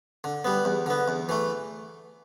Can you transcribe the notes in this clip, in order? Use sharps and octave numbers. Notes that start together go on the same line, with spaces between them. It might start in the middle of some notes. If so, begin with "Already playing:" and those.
D3
G3 B3
E2
D3 B3
E2
E3 A3